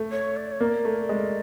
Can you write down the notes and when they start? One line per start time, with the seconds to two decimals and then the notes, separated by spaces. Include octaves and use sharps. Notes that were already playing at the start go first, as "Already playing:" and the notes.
Already playing: A3
0.11 C#5
0.36 D5
0.52 C#5
0.60 A#3 D5
0.85 A3
1.09 G#3